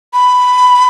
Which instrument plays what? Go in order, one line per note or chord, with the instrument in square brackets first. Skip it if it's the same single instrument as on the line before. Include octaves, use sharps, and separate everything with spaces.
[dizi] B5